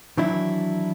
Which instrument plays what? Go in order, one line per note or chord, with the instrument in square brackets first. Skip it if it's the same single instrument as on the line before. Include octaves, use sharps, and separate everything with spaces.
[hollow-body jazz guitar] D#3 E3 F#3 D4 E4